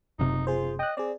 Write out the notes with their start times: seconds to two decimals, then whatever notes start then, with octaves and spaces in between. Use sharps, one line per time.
0.19 F#1 C3 D#4
0.47 F4 G#4 C5
0.79 D#5 G5 F#6
0.97 C4 G#4 D5